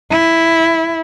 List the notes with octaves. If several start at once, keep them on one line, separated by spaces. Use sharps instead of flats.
E4